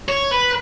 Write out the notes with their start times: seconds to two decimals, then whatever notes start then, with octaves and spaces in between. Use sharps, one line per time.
0.09 C#5
0.31 B4